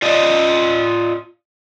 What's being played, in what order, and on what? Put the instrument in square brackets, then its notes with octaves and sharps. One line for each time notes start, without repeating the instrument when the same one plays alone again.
[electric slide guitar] F4 D5 D#5